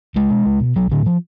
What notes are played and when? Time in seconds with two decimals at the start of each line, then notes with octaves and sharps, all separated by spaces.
0.15 C#2 G#3
0.30 B2
0.45 C#2
0.60 B2
0.76 B1 F#3
0.91 A2 D3
1.06 F3